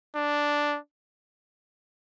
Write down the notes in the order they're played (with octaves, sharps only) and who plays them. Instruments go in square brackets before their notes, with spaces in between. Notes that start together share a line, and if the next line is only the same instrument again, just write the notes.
[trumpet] D4